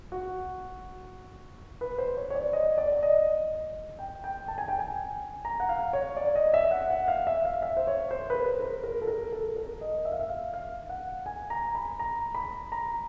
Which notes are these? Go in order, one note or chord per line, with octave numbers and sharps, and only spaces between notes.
F#4
B4
C5
C#5
C#5
D5
D#5
D5
D5
D#5
G5
G5
A5
G#5
G5
G#5
A#5
F#5
F5
C#5
D5
D#5
E5
F#5
F#5
F5
E5
F5
E5
C5
C#5
C5
B4
A#4
A#4
A#4
A4
A#4
A4
A#4
D#5
E5
F5
E5
F5
F5
F#5
G#5
A#5
B5
A#5
B5
A#5